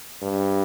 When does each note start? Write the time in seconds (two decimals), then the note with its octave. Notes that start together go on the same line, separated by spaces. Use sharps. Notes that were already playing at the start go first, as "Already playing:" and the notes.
0.22 G2